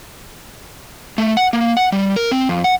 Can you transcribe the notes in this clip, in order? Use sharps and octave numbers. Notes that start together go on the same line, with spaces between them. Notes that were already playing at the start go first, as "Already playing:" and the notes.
A3
F#5
A#3
F#5
G3
A#4
C4
F2
F#5